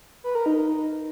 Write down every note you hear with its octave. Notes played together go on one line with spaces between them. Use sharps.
B4
A#4
D#4